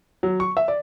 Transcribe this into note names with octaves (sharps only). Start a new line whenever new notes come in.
F#3
C#6
E5
D5